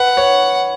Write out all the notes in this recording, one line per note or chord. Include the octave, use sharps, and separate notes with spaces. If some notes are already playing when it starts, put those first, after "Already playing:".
Already playing: B4 F#5
C#5